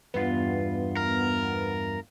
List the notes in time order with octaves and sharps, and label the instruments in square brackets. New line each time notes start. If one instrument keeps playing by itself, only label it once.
[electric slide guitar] E2 G2 F4 [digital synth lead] B3
[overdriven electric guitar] A#4